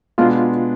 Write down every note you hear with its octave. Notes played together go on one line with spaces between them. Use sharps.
B2 G#3 B3 D4 F4